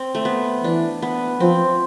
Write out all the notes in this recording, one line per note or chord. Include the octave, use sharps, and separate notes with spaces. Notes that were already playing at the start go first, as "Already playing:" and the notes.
Already playing: C4
A3
B3
E3 D4
B3
F3 C4